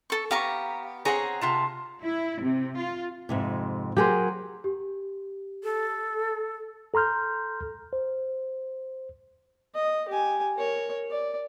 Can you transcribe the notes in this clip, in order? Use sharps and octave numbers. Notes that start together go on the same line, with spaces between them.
A4 C#6
B3 G4 F5 A#5 C#6
C4 G#4 C#5 F#5 A#5
C3 F4 A5
E4
C3
F4
F2 G#2 C3
F#3 G4 G#4 A#4 C5
G4
A4
A4 A#5 C6 F6 G6
C5
D#5
G4 G#5
A#4 C#5
D5